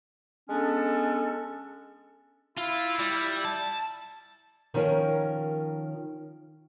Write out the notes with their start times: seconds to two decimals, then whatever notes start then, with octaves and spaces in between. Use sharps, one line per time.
0.50 G#3 B3 C#4 D4 A4
2.58 E4 F4
3.00 G3
3.45 A5
4.74 D#3 F3 C#4 A#4